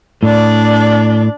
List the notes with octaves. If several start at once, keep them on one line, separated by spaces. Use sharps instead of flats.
A2 D4 D5